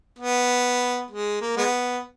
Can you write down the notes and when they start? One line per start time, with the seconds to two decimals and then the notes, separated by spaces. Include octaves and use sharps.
0.19 B3
1.11 G#3
1.42 A#3
1.57 G#3 B3